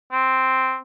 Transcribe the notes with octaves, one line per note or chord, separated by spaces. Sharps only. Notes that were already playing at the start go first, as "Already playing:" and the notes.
C4